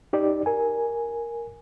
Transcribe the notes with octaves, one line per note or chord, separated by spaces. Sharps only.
D#4 G4 D5
A#4 G#5